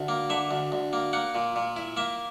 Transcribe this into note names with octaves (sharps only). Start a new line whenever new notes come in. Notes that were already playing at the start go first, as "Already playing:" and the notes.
Already playing: D2
A#3
D3 E5
D2
D2
A#3
A#3 F#5
A#2
A#2
E4
A#3 E5